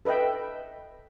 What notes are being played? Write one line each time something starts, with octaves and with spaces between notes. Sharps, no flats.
A4 B4 D#5 E5 G5